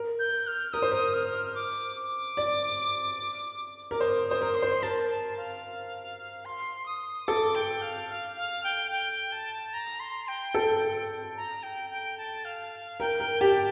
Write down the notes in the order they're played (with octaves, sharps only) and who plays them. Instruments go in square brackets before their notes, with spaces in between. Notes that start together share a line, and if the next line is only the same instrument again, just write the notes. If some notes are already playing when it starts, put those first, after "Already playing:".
Already playing: [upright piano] A#4
[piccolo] G6
F6
[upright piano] A#4 [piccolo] D#6
[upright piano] C5
A#4
[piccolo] F6
D6
D6
[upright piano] D5
[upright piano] A#4 [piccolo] D6
[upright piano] C5 [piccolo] D#6
[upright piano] C5 [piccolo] D#6
[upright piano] A#4
[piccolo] C6
[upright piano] C5
[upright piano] A#4 [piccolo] A5
[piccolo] A5
F5
C6
D#6
[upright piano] A4 [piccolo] D6
[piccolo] G5
F5
F5
F5
G5
G5
A5
A#5
C6
G5
[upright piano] A4
[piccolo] A#5
G5
G5
A5
F5
F5
[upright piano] A#4 [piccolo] G5
[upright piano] A#4
[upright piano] G4 [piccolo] A5